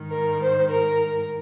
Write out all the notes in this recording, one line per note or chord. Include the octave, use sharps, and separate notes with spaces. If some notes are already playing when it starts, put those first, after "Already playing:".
Already playing: G#2 D#3
A#4
C5
A#4